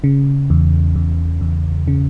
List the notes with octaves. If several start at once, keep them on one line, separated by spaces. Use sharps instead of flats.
C#3
E2
E2
E2
C#3